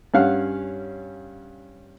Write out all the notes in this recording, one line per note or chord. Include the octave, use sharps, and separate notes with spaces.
G2 C#4 F5 F#5